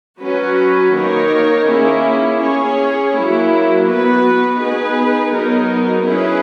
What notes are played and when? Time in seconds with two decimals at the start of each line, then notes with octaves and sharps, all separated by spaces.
0.21 F#3 C#4 F#4 B4
0.94 D#3 A#3 D#4 A#4 C#5
1.67 A#3 C#4 E4 G#4
2.40 C#4 G#4 C#5
3.14 F#3 A#3 E4
3.87 B3 F#4 B4
4.60 B3 D#4 G#4 B4
5.33 F#3 B3 D#4 A#4
6.06 C#4 E4 G#4 B4